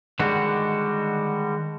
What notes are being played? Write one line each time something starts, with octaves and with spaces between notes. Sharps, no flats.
D3 D#3 G3 G#3 F#4